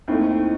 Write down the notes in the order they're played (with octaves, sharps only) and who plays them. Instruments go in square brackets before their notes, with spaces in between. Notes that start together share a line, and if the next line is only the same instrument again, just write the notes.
[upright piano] D#2 D#3 A3 [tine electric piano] C4 E4